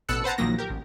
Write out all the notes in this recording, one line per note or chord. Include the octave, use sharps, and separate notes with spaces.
A1 B2 A4 E6 F#6 C#7
B4 C5 F#5 A5 A#5
A#1 D#3 F3 F#3 A#3 A#6
G4 A#4
A1